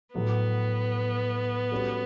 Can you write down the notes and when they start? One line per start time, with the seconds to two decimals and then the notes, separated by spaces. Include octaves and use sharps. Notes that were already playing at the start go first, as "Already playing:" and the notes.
0.15 A2 F#3 A3 B3
1.72 G3 C#4 F#4 A4